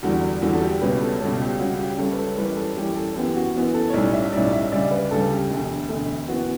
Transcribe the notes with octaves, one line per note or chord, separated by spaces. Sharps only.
E2 D3 G3 F#4
E2 D3 G3 F#4
A4
G4
C#2 B2 G3 C#4 B4
A4
C#2 B2 G3 C#4 A4
G4
C#2 C#3 G3 C#4 F#4
G4
C#2 C#3 G3 C#4 A4
B4
A4
F#2 E3 G3 C#4 B4
A4
F#2 E3 G3 C#4 G4
A4
F#2 E3 B3 G4
F#4
F#2 E3 B3
A4
C#5
B1 A2 G3 C#4 D5
E5
B1 A2 G3 C#4 D5
E5
D2 C#3 G3 D5
B4
D2 C#3 G3 A4
G4
E1 D2 D3 A3
E1 D2 D3 A3
F#2 E3 B3 F#4